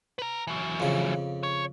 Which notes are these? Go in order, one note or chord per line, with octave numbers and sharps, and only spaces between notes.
B4 A#5
E3 F#3
F2 C#3
C#5